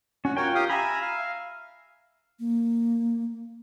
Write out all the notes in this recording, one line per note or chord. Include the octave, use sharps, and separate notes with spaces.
C#4 F#4
F4 F#4 A#4 C#5 G5
G4 F5 D#6
E5 G#5 A#5 B5
F5
A#3